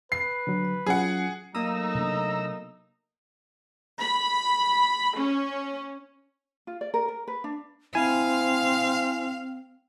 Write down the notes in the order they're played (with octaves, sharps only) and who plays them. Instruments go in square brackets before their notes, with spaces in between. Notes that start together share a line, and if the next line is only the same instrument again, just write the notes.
[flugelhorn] B4 [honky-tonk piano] C7
[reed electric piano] D3 F#3
[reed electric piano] F#3 C#4 F4 [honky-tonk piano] G#4 F#5
[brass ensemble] F#3 A3 D#4 [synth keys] A#3 D#6 [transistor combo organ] A#5 E6
[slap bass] C3 B3 D4
[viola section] B5
C#4
[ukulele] F4
D5
A#4
A#4
B4
D4
[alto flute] C4 [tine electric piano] E4 G#5 [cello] F5